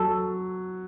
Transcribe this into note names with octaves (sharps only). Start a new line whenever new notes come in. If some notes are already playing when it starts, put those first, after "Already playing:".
Already playing: F#3 A4